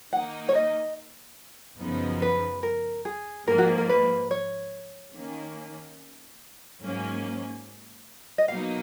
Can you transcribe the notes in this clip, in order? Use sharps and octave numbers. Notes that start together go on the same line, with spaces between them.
D#3 A#3 D#4 F#5
C#5
D#5
F#2 C#3 F3 B3 D#4
B4
A#4
G#4
G#2 F3 A#3 A#4
F#4
G#4
A#4
B4
C#5
D#3 A#3 C#4
G#2 F#3 A#3 C#4
D#5
B2 F#3 A#3 D#4 F5